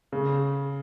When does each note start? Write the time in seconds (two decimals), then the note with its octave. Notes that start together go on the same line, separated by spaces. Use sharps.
0.12 C#3